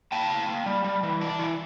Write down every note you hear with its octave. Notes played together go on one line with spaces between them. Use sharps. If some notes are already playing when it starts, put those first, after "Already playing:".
A#3 G5 A5
A#3
A#3
G3
G3
E3
D4
E3